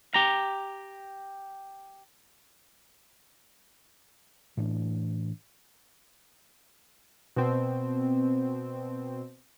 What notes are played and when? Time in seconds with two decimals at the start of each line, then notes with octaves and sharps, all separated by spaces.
0.14 G4 A#5
4.57 A2 E3 D4
7.36 B2 C4